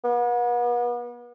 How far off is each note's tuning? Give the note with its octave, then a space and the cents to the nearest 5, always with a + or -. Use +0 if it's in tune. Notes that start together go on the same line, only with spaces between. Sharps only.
B3 -40